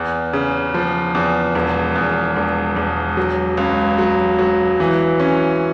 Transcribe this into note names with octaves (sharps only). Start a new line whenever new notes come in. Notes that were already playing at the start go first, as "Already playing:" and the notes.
Already playing: E2
C#3
F3
E2
E1
E2
E1
E1
F#3
C#2
F#3
F#3
E3
C#4